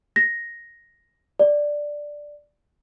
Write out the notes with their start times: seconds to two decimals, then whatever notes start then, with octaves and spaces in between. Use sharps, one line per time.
0.16 A#6
1.39 D5